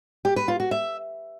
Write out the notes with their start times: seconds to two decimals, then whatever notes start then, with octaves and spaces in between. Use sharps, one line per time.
0.25 G4
0.36 B4
0.48 F4
0.60 F#4
0.71 E5